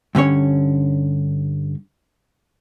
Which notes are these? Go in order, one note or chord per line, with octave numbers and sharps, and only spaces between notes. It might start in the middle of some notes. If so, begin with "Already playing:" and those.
G2 D3 C#4 C#5